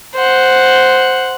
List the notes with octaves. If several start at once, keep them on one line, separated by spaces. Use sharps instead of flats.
C5 F#5